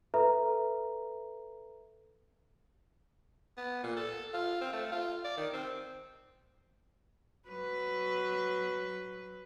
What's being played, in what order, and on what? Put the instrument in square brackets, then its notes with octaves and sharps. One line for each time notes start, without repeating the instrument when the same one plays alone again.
[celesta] A4 B4 E5 A#5
[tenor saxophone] B3
A#2
A4
F4
C4
A3
F4
D5
D#3
C4
[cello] F#3 B4